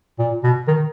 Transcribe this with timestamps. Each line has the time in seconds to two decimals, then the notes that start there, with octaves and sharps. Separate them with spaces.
0.19 A#2
0.44 B2
0.68 D#3